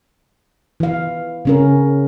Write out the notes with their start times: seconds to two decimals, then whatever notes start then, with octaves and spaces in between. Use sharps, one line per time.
0.80 E3 F5
1.45 C#3 C#4 A#4